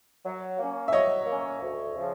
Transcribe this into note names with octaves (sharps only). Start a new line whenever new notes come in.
F#3
A#3 C#4
E5
F#3 C#5 D#5
A#3 C#4
D2
C#3 F3